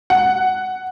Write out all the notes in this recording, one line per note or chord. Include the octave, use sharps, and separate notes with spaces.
F#5